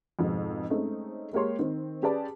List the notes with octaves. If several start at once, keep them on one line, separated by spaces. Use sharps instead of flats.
F2 G#2 B2
G#3 A3 C4 C#4 D#4
G#3 A#3 G4 C#5 C6
D#3 C4
C#4 G4 G#4 B4 D5 A5